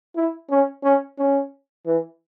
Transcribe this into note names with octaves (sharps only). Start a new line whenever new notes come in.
E4
C#4
C#4
C#4
E3